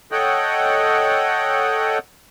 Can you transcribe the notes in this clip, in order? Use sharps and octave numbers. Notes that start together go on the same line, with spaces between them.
A4 C#5 D#5 F#5 G5